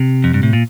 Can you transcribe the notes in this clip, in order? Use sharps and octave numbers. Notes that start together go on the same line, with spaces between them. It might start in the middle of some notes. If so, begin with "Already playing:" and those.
Already playing: C3
F2
G2
A2
A#2